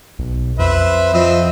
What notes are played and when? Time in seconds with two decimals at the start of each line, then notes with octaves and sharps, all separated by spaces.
0.19 B1
0.59 F2 B4 C5 E5
1.13 F3 C4 D#5 E5